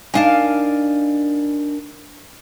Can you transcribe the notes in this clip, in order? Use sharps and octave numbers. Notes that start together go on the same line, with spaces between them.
D4 D#4 A#4 F5 G#5 A5